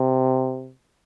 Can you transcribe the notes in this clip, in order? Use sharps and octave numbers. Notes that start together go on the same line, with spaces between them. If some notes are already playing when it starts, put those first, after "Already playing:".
Already playing: C3